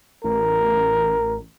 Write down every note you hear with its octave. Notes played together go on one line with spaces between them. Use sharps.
A1 A#4